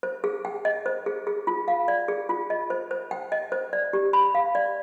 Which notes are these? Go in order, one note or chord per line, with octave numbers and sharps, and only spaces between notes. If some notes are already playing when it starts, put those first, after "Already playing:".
C5
G#4
G5
D#5
C5
G#4
G#4
F4
F5
D5
G#4
F4
D#5
C5
C5
G5
D#5
C5
D5
G4
B5
F5
D5